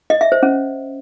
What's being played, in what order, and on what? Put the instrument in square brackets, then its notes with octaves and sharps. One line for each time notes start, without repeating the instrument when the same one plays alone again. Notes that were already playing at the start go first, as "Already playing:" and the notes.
[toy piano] D#5
E5
C5
C#4